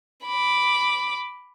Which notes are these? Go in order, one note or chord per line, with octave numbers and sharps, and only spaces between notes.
B5 D6